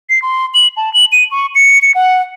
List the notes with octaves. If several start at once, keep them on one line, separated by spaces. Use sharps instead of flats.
C7
C6
F#7
A5
F#7
D#7
C#6
C#7
C#7
F#5